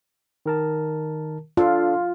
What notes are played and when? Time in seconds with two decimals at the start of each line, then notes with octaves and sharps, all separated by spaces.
0.46 D#3 A#4 A5
1.57 D4 F4 A4 F5